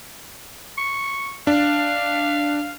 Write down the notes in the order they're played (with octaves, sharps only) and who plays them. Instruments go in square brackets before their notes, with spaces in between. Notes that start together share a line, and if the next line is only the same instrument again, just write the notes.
[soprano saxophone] C#6
[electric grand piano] D4 [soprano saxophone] F5